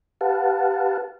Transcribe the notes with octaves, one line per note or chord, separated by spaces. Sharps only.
G4 B4 F5 F#5 A5